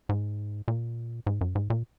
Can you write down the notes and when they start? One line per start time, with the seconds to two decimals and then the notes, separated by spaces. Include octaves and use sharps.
0.09 G#2
0.68 A#2
1.27 G#2
1.41 F#2
1.55 G#2
1.70 A#2